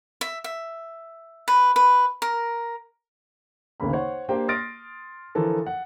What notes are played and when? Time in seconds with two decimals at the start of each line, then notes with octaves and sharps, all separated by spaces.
0.21 E5
0.44 E5
1.48 B4
1.76 B4
2.22 A#4
3.80 G#1 D2 C#3 A#3 B5
3.93 C5 C#5 F#5
4.29 A#3 D4 G4 C5 G5
4.48 C6 D#6 F6 A6 A#6 D7
5.35 D3 E3 F3 F4 A4 A#4
5.66 F#5